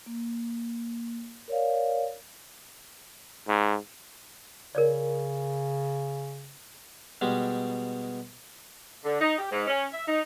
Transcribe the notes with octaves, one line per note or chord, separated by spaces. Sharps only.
A#3
A#4 C#5 D5 F5
G#2
C#3 A#4 C#5 D5
B2 G3 G#3 G4
D3
D#4
G4
G#2
C#4
E5
D#4